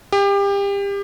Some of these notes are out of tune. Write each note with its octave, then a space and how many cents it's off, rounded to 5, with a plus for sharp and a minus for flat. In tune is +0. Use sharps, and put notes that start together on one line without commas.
G4 +30